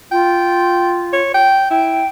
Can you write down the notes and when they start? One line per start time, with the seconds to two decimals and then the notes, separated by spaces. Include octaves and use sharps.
0.11 F4 G5
1.13 C#5
1.34 G5
1.71 E4 G5